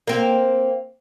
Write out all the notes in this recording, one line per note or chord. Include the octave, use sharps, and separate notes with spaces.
A#3 C4